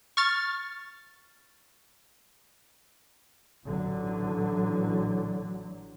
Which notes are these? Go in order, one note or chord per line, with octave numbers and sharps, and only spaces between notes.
C#6 F6 A6
A1 D3 F#3